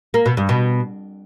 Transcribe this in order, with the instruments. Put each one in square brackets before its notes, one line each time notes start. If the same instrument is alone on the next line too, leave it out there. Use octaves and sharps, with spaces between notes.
[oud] A#3
B2
G2
B2